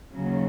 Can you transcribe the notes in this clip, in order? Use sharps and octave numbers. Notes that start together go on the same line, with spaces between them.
D#2 C#3 F#3